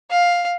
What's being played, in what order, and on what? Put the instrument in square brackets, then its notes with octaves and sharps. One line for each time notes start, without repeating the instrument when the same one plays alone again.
[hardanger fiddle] F5